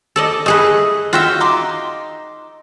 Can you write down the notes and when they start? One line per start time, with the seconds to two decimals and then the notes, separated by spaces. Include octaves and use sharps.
0.16 A4 D5 D#5
0.46 A3 G#4 B4 D#5
1.13 F4 F#4 E5 F#5 G5
1.40 D#4 C6 D6